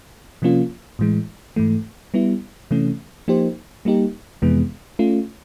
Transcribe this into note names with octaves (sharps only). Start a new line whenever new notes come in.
C3 F3 A#3 C#4 F4
A2 E3 G#3
G#2 E3 A3
G3 B3 E4
C3 E3 A3 C#4
F3 A#3 D#4 G4 C5
G3 A#3 D#4 G4
F2 C3 E3 G#3 B3
A3 C#4 F4